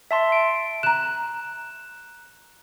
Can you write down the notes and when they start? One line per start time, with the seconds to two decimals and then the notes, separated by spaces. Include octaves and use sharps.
0.11 E5 A5 C6
0.32 D7
0.83 A#5 F#6 E7